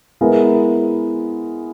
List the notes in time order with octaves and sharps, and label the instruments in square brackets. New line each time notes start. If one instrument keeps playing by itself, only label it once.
[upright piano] G#3 B3 E4 A#4